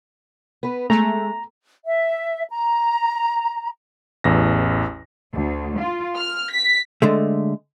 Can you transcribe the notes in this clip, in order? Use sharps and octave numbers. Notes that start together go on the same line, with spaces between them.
B3 B4
G#3 A3 A#5
E5
A#5
A1 E2 A#6
D2
F4
F6
B6
D3 G#3 A3